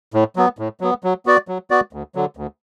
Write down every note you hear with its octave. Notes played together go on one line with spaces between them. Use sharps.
A2
F#3 B3
A2
F#3 B3
F#3
B3 F#4 D5
F#3
B3 F#4 D5
D2
D3 F#3
D2